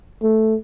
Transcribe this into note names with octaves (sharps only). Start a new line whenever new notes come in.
A3